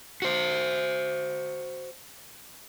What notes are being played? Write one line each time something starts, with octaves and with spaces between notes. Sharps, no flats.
F#4 C5